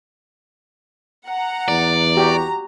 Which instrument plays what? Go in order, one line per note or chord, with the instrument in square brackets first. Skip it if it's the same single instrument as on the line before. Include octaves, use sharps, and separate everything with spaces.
[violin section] F#5 A#5
[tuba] E2 [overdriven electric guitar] D5
[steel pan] F#4 G4 [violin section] A#5